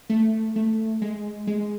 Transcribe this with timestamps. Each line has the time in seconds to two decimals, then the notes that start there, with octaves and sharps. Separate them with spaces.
0.10 A3
0.56 A3
1.02 G#3
1.47 G#3